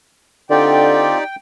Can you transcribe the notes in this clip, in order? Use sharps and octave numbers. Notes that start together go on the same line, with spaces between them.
D3 C4 D#4 F4 G4 D5 G5